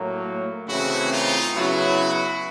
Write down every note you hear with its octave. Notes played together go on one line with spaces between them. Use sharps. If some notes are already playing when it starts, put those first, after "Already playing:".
Already playing: A2 F#3 A#3
C#3 E3 A3 C4 E4 F#4
D#4 F4
C#3 F#3 B3 E4 F#4